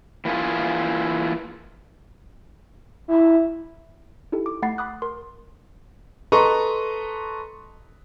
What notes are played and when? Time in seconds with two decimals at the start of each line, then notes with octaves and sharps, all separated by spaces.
0.25 E3 A#3 E4 F4 G#4
3.08 E4
4.32 D#4 E4 G4 A4
4.46 D6
4.62 A3 F#5 B5 A6 C7
4.78 B5 D6 D#6 F#6
5.02 A#4 C6
6.32 A4 B4 D#5 A#5 C6 C#6